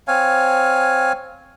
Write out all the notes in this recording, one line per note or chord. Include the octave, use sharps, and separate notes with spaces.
C4 C#5 F5 G#5